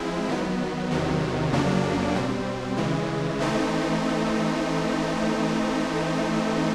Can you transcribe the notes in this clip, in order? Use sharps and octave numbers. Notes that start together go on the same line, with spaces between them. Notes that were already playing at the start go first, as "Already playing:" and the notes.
Already playing: F3 G#3 C4 E4
D#3 F#3 B3
E2 C3 D#3 F#3
F2 C#3 F#3 A#3 D4
B2 G3 C4
C#3 E3 G#3
E3 A3 C4 D#4